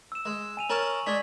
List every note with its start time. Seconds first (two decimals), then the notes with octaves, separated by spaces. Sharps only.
0.12 E6 E7
0.26 G#3
0.57 G#5 D#7 F7
0.70 C#4 A#4 A5 C#6 F#7
1.07 G#3 D4 G#6 B6